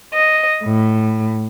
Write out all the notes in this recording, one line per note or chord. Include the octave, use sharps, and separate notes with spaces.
D#5
A2